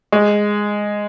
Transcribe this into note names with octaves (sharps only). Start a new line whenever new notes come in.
G#3